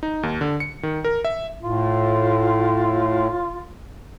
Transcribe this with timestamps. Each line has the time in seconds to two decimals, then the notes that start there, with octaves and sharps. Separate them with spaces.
0.03 D#4
0.23 D#2
0.41 D3
0.60 C#7
0.83 D#3
1.04 A#4
1.25 E5
1.63 A2 F4